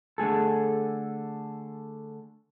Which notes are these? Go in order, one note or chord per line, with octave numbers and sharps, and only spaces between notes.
D3 A3 G#4 A4